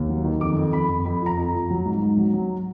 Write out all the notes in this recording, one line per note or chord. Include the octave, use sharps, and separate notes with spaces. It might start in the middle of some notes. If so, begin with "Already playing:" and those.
Already playing: D#2
F#3
D#3
F2 D6
F2
F2 B5
F2
F2 B5
F3
A#5
F2
A#5
F3
F#3
G#2
G#2
F#3
F#3